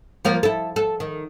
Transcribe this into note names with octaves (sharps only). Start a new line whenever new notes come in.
F3 A#3 A#4
E4 A4
A4
D#3